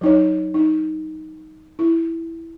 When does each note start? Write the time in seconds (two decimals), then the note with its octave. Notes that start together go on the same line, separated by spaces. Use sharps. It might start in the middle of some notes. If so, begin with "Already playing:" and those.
0.01 F#3 D#4 C#5
0.54 D#4
1.79 E4